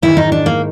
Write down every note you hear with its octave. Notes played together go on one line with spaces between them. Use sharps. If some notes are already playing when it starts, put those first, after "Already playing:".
G#2 D#3 E4
D#4
D4
A#3